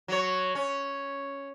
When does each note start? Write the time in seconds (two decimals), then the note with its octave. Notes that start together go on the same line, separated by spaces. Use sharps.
0.08 F#3 C#5
0.55 C#4